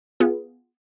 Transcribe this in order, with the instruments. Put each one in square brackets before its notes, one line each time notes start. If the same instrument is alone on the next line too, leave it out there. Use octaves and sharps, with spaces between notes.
[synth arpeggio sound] B3 F4 G#4